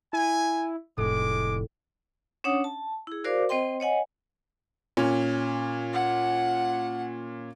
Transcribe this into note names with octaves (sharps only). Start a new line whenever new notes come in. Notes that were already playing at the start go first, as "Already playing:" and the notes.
E4 G#5
F1 A2 G#3 D6
C#4 D4 C#5 F#5 D#6
A5
E4 G#4
F#4 A#4 C5 D5 F5 D6
C4 C5 D#5 G5 C6
C#5 D#5 F#5 G#5
A#2 C#4
F#5